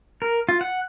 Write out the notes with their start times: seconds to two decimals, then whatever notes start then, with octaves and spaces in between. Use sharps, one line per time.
0.22 A#4
0.49 F4
0.61 F#5